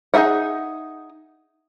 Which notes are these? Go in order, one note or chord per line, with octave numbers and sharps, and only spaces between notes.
D#4 F4 G#4 E5 F#5